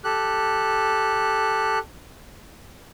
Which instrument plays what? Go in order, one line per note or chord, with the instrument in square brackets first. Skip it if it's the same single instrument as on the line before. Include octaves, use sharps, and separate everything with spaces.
[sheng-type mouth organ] G4 A4 F#6